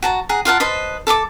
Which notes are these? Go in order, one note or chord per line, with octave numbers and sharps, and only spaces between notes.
F#4 A5 A#5
G#4 F#5 A#5
F4 A#4 F#5 A5
B4 C5 D#5 A5
A4 A5 C6 D6